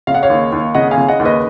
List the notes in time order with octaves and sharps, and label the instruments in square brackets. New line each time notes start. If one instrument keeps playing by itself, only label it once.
[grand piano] C#3 F5
F#5
C#5 F5
D#2
D#2
C#3 D#5 F#5
F5 G#5
C#3
D#5 F#5
D#2
B4 D#5